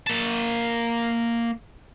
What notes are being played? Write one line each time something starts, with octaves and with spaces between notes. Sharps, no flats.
A#3 A5